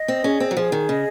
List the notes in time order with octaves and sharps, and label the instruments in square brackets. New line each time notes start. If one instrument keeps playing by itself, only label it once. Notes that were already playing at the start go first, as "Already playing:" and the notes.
Already playing: [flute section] D#5
[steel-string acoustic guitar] C4
[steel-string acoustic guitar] C#4 [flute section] G#4
[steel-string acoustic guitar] C4
F#3
[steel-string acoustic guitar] F3 [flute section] G#4
[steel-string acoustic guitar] D#3
[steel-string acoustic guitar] C#3 [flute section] D#5